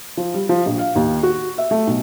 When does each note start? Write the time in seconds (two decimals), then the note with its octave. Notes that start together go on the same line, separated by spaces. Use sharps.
0.17 F3
0.34 G3
0.49 F3
0.66 A#1
0.78 F5
0.96 D#2
1.23 F#4
1.58 E5
1.71 A3
1.87 B1